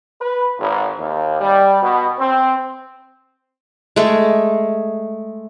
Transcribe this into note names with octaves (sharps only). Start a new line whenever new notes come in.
B4
G#1
D#2
G3
B2
C4
G#3 A3